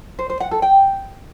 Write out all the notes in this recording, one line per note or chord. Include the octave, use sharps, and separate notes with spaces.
C5
C5
F#5
A4
G5